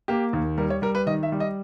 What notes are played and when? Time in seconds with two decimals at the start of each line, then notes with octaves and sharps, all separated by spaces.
0.08 A#3 G4
0.33 D#2
0.58 G3 A#4
0.70 C#5
0.82 G3 A#4
0.95 B4
1.06 D#3 D#5
1.23 E5
1.32 G3
1.40 D#5